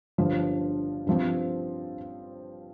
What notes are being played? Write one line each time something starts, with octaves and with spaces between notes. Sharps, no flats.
G1 G2 D3 F3 D4
G2 F3 C4